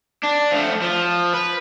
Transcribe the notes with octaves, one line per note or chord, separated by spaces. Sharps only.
D4
F3 A3
F3
B4